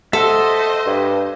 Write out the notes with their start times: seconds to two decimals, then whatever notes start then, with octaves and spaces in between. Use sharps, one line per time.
0.13 A4 C5 D#5 E5 F#5 E6
0.86 G2